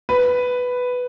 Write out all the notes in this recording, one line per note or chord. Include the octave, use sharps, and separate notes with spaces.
B4